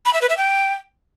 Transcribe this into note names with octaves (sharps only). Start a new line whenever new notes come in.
B5
E5
B4
E5
G5